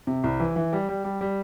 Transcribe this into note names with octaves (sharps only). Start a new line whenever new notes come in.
C3
C2
E3
E3
G3
G3
G3
G3